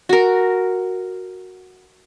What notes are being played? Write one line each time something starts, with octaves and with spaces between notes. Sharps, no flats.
F#4 A#4